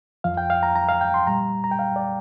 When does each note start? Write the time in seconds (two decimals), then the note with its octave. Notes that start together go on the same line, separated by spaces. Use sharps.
0.24 F2 F3 F5
0.37 G5
0.50 F5
0.63 A#5
0.75 A#5
0.89 F5
1.01 G5
1.14 C6
1.27 A#2 G3 A#5
1.64 A#5
1.71 G5
1.79 F5
1.96 D5